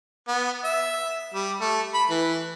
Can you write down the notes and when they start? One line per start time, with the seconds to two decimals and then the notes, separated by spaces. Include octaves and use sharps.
0.28 B3
0.64 E5
1.34 G3
1.60 A3
1.94 B5
2.10 E3